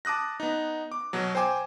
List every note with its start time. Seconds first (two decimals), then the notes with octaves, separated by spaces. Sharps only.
0.05 A5 D6 D#6 F#6 A#6
0.40 B3 D#4
0.92 D6
1.13 B2 F#3
1.35 C5 G5 G#5 D6